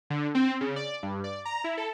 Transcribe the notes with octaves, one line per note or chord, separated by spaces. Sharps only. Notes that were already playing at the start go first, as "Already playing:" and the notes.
D3
C4
C#3
D5
G2
D5
A#5
E4
A4